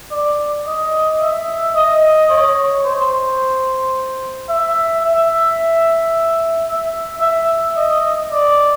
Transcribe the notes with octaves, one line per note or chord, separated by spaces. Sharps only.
D5
D#5
E5
D#5
C#5
C5
E5
E5
E5
E5
D#5
D5